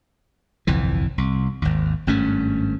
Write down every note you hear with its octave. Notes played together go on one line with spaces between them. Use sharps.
G1 C2 F2 E3
C2
G#1 D#2
G#1 G2 A3 C#4